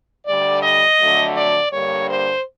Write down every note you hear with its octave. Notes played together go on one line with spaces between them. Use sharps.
D2 D3 G3 D5
D#5
F2 D3 F#3 A3
D5
G2 D3 G3 A#3 C#5
C5